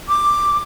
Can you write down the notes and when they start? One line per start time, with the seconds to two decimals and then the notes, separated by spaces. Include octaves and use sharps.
0.08 D6